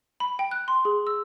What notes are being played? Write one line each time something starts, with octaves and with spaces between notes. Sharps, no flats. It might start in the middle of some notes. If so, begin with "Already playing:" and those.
B5
G5
F#6
C6
G#4
E6